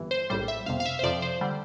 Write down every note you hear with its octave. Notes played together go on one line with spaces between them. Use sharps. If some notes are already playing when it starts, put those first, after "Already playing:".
Already playing: G1 G2 E3
C5
A#1 A2 G3 C5
E5
G1 F2 C3 F5
F5
E5
C5
F2 C3 F3 D5
C5
D3 G3